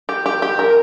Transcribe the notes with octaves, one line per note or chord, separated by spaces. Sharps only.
G4
G4
G4
A#4